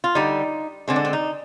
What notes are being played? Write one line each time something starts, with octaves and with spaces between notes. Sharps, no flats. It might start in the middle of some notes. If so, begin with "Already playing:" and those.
F4
D3 G3 D#4
D3 G#3 C4
D4
C4
D#4